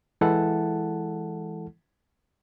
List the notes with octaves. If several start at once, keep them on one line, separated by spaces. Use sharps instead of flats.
E3 G#3 E4 A4 F#5 A5